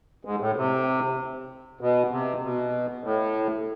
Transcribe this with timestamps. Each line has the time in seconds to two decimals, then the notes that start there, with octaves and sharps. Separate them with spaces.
0.25 G#2
0.40 A2
0.57 C3
1.81 B2
2.11 C3
2.43 B2
3.04 A2